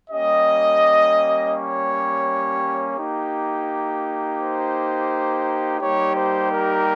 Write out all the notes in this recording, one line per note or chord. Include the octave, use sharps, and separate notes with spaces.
G3 A#3 C#4 G4 D#5
C#5
A#3 D#4 G4
C5
G3 A#3 D#4 G4 C#5
C5
A#4